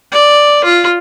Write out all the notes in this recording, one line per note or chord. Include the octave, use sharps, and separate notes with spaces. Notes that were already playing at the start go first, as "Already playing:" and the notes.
D5
F4